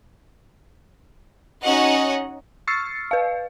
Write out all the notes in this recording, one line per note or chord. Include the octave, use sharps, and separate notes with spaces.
C#4 D#4 F#4 C#5 D#5 F#5
C#6 E6 F6 A6 C7 C#7
B4 F5